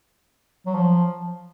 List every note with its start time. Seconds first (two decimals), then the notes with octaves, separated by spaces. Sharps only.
0.66 F#3
0.75 F3